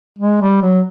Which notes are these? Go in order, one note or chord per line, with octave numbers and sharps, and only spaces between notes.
G#3
G3
F#3